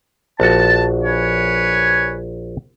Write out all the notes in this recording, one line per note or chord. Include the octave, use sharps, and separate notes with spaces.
A#1 F#4 A5
B4 C#5 G#5